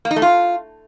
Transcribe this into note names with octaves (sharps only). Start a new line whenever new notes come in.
A#3
D#4
A3
F4